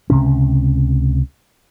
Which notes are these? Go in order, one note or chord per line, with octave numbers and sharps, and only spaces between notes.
C#2 C3 C#4